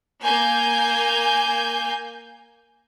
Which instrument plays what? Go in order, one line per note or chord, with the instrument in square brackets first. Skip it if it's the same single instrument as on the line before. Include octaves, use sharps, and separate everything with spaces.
[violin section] A#3 G#5 G6